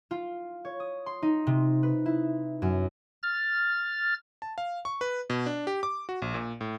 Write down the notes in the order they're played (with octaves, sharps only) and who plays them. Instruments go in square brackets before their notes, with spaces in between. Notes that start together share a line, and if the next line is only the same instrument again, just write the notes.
[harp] F4
C#5
D#6
C6
D#4
C3
B4
E4
F#2
[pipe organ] F6 A6
[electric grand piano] A5
F5
C#6
B4
B2
D4
G4
D6
F#4
A#1
A#2
A2